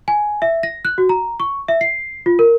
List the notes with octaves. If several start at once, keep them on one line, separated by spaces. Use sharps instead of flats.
G#5
E5
A#6
F#6
F#4
A#5
C#6
E5
C7
F4
A#4